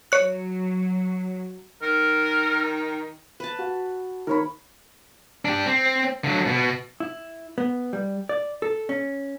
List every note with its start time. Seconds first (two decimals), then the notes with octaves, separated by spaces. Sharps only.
0.12 F#3 C#5 F#6
1.82 D#3 A#4
3.40 B4 A5
3.59 F#4
4.27 D#3 A#4 C#5 B5
5.45 D4 G4
5.66 C4
6.24 D3 F#3
6.47 B2
7.00 E4
7.58 B3
7.93 G3
8.29 D5
8.62 A4
8.89 C#4